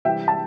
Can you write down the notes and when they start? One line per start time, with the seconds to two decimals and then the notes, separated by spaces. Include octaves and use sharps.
0.05 C3 E3 G3 E5 G5
0.28 A5